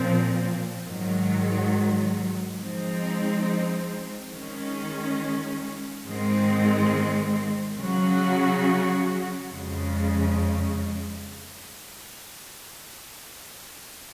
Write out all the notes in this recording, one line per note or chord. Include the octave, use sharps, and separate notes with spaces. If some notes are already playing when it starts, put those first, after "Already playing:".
Already playing: A#2 F3 C4
G#2 D#3 F#3
F3 G#3 C4 D#4
D#3 G#3 C#4
G#2 D#3 G#3 C4
C#3 F#3 C#4 F#4
F2 C#3 G#3